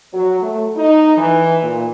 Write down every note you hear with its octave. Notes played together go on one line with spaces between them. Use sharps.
F#3
A3
D#4
E3
A#2